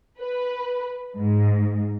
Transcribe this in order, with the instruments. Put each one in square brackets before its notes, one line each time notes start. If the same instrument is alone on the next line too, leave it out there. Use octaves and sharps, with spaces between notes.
[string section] B4
G#2